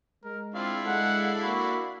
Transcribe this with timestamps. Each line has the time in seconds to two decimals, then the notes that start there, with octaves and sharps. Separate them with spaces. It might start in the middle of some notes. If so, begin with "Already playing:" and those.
0.24 G#3 A#4
0.54 C4 D4 E4 F4 F5
0.86 G#3 A4 F#5
1.43 A#3 F#4 B5